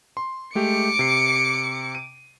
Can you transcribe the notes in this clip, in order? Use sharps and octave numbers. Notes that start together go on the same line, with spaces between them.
C6
G#3 A3 G4 D6 C#7
C3 C7
D#7